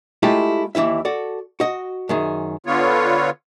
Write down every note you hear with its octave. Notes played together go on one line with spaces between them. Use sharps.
G#3 A3 E4 F4 G4 F5
D#2 E3 G#3 E4 E5
F#4 A4 D5
F#4 D#5
F#2 D#3 G#4
D3 B3 F4 C#5